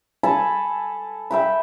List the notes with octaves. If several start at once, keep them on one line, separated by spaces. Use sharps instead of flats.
A4 G#5 A5 B5
E5 G5 B5